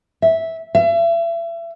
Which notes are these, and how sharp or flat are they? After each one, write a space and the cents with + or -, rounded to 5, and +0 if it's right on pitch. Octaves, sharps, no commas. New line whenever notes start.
E5 -10
E5 +35